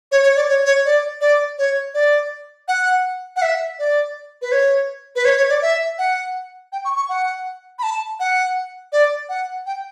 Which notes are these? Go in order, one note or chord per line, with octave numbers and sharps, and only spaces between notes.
C#5
C#5
D5
C#5
C#5
D5
D5
C#5
D5
F#5
F#5
E5
D5
B4
C#5
B4
C#5
C#5
D5
E5
F#5
G5
C#6
C#6
F#5
B5
A5
F#5
D5
F#5
G5